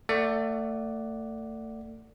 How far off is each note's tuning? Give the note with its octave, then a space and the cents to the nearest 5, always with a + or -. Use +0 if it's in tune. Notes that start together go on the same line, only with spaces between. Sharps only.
A3 +30 D5 +0 F#5 +10